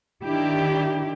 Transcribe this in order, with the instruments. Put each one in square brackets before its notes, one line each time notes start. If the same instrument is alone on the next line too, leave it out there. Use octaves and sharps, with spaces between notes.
[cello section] D#3 D4 E4 G4